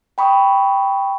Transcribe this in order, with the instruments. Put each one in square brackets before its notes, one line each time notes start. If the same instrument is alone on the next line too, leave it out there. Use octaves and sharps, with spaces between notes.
[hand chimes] G5 B5 C#6 D#6